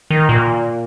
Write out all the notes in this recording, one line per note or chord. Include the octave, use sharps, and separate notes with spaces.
D#3
A#2